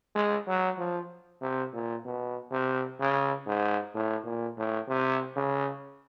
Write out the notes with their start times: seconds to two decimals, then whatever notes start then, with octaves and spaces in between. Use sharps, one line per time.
0.15 G#3
0.48 F#3
0.78 F3
1.42 C3
1.74 A#2
2.05 B2
2.52 C3
3.00 C#3
3.47 G#2
3.95 A2
4.25 A#2
4.57 A2
4.88 C3
5.36 C#3